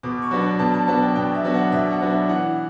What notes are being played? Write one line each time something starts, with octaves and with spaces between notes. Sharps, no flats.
B2 D6
C#6
F#3 B3 D4
D6
B2 A5
A5
F#3 B3 D4 A5
G5
B2 G5
E5
F#3 B3 D4
F#5
B2 E5
F#5
F#3 B3 D4
E5
E3 F#5